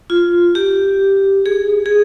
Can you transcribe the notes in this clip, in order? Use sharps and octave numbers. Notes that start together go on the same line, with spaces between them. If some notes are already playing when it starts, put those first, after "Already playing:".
F4
G4
G#4
G#4